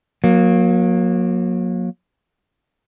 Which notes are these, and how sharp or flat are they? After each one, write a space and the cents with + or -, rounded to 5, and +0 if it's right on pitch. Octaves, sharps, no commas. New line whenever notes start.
F#3 -30 A#3 +15